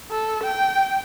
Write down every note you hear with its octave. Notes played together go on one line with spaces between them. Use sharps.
A4
G5